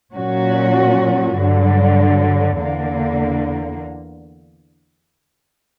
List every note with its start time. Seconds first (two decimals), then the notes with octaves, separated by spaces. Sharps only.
0.13 A#2 F#3 C#4 F#4
1.34 G2 D3 F#3
2.57 E2 D3 A#3